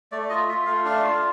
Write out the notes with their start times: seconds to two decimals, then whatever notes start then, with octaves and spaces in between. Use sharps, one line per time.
0.12 A3 D5
0.29 F4 D#5
0.48 F4 E5
0.66 A3 F5
0.85 D4 F5
1.04 F4